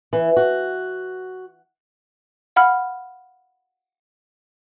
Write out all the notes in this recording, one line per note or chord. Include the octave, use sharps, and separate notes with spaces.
E3
F#4
F5 F#5 B5 F6